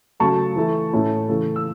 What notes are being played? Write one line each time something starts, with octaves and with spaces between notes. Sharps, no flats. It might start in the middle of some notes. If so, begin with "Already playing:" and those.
C#3 F#3 A3 A5 C#6
E3 A3 E4
A2 A3 C#4 E4
C#3 E3 A3
E6